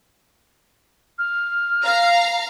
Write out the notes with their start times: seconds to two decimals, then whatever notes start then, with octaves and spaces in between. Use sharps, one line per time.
1.19 F6
1.85 F5 A#5